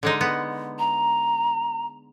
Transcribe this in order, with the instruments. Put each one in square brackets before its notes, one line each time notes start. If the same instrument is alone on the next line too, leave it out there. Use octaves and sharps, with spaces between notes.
[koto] D3 G#3 D#4
B3
[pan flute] A#5